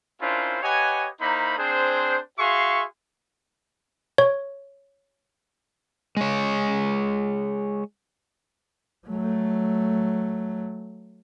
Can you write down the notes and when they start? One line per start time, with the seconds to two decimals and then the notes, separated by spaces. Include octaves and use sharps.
0.21 C#4 D4 E4 F4 A#4 C5
0.63 G4 B4 C#5 D#5 F#5 G#5
1.21 A#3 D#4 E4 C5 A#5 B5
1.58 C4 D4 G#4 C5
2.39 F#4 G#4 E5 F5 C6 C#6
4.18 C#5
6.17 G#3 C#5
9.08 F#3 A3